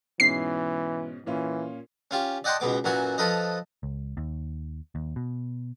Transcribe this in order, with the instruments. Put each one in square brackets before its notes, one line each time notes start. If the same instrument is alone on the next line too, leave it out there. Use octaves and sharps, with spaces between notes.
[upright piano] G#2 B2 C#4 [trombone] E3 [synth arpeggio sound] C7
[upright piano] A#2 C#4 F4 [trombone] E3
[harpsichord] C#4 F4 G4
D5 D#5 F#5 G5 A5 C6
C#2 B2 B3 D6
F#2 A#2 E3 F#4 F#5 G#5
F3 A4 B4 D#5
[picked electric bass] C#2
D#2
D#2
B2